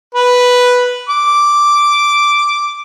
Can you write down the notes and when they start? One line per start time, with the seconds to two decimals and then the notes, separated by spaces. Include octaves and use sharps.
0.15 B4
1.09 D6